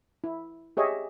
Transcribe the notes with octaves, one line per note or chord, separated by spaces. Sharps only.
E4
G4 G#4 C#5 D#5 E5